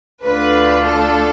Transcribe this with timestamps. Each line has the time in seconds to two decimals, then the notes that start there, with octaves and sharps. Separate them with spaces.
0.24 D2 D3 A3 D4 F4 B4
0.87 A4